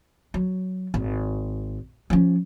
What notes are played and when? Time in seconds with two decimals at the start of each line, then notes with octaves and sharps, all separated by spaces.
0.34 F#3
0.94 G#1
2.10 F3 C#4